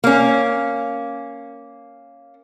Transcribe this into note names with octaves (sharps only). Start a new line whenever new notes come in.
A#3 C#4